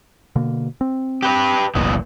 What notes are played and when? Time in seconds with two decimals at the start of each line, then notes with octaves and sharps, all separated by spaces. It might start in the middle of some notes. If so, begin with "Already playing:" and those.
0.36 B2 D3 A#3
0.81 C4
1.22 G4 B4
1.75 F#1 C2 F#2 A#2 E3 B3